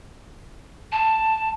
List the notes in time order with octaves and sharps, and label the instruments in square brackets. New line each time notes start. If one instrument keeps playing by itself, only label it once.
[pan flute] A5